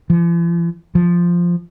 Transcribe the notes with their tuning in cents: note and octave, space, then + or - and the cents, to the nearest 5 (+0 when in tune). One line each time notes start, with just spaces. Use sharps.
F3 -45
F3 -5